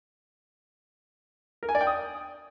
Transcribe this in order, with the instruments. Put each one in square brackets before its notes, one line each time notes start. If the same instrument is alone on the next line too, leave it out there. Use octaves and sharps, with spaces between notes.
[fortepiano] A#4
G#5
D5
G5
D#6